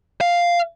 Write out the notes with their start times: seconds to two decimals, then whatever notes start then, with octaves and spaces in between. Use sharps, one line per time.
0.21 F5